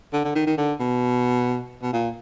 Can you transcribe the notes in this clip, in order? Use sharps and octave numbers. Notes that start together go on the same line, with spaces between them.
D3
D3
D#3
D#3
D3
B2
B2
A#2